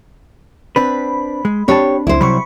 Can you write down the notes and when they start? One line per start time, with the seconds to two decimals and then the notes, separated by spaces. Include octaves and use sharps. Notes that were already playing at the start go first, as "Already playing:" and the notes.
0.76 C4 D4 B4 B5
1.45 G#3
1.68 C4 D4 G4 C#5 A5
2.07 C#2 E4 C5
2.21 C3 F#3 G3 B5 C#6